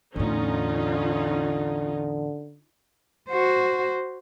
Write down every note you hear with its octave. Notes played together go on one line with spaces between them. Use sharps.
E2 A2 D3 C#4 D#4 F4
F#4 C5